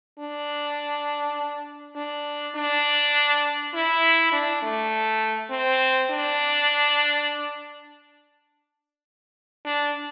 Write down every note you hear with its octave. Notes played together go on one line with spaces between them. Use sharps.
D4
D4
D4
E4
D4
A3
C4
D4
D4